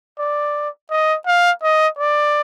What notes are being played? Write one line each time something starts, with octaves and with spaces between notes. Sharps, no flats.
D5
D#5
F5
D#5
D5